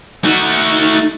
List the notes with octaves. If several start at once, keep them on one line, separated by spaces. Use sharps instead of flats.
A3 D#4 F#4